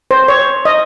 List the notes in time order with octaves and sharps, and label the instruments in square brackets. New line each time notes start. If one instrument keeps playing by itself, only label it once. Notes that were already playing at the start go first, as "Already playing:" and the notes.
[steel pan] C5
C#5
D#5